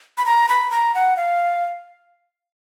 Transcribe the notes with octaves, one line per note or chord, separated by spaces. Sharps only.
B5
A#5
B5
A#5
F#5
F5